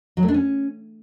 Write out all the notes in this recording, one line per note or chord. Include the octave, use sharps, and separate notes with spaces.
F#3
A3
D4
C#4